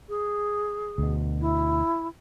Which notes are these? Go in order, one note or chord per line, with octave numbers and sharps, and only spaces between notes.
G#4
D2 B2
E4